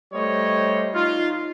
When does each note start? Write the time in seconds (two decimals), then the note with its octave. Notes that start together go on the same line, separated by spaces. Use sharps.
0.13 G3 A3 C5 C#5 D#5
0.94 D#4 F4